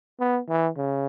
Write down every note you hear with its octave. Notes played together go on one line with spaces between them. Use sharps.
B3
E3
C#3